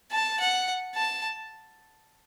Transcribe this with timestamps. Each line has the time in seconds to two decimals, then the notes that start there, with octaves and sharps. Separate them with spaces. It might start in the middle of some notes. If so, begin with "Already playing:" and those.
0.12 A5
0.40 F#5
0.95 A5